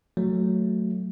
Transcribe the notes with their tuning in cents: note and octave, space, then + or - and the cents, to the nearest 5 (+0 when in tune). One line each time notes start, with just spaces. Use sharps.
F#3 +0 A3 +0